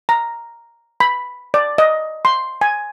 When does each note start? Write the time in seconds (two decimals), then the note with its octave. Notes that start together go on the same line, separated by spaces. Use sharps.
0.09 A#5
1.00 B5
1.54 D5
1.78 D#5
2.25 C6
2.61 G#5